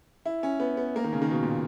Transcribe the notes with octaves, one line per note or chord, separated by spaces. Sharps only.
E4
C#4
B3
B3
A#3
D#3
C#3
D#3
B2
A#2